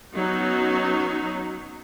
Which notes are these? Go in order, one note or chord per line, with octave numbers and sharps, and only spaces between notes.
F#3 B3 C#4 D#4 F#4